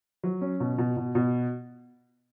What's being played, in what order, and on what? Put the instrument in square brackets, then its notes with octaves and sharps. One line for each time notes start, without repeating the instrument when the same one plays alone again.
[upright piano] F#3
C#4
B2
B2
B2
B2